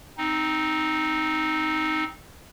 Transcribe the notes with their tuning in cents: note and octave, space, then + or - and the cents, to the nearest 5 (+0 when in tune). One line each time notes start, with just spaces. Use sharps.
C4 +0 D#4 +0